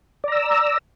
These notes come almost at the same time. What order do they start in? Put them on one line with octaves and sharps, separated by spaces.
D5 A#5 E6